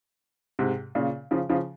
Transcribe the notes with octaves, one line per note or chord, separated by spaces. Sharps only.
G#2 C3
A#2 C#3
C#3 F3
C#3 F3